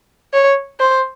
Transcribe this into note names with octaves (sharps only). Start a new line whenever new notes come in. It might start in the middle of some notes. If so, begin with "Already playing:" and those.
C#5
C5